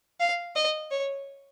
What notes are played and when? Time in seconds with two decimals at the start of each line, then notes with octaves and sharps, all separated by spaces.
0.20 F5
0.56 D#5
0.91 C#5